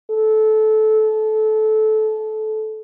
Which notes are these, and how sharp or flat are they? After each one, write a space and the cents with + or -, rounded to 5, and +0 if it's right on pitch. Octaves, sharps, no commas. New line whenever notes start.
A4 -20